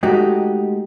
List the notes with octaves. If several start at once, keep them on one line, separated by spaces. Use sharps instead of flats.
G#3 A3 D#4 F#4 G4